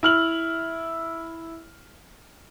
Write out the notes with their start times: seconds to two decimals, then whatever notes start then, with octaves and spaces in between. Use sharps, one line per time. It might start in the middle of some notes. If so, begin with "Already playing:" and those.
0.03 E4 F6 F#7